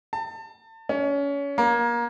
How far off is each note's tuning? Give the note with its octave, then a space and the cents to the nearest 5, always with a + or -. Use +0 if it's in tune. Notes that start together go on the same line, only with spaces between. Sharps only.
A5 +35
C#4 +30
A#3 +25